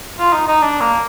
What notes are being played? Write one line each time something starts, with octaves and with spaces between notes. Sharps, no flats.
F4
D#4
D#4
D4
A#3